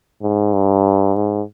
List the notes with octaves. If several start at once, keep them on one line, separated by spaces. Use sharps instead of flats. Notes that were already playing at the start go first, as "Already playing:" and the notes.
G#2
G2
G#2